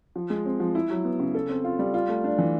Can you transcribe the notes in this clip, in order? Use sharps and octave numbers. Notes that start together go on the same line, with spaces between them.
F3
G#3
C4
F3
E4
F#3
B3
C#3
A4
C4
F4
G3
F4
A3
D4
E3